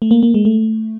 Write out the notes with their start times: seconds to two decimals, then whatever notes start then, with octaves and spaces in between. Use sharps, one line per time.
0.02 A3
0.11 A#3
0.23 A#3
0.34 G#3
0.45 A3